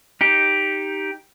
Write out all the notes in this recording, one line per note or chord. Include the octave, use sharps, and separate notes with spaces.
D#4 G4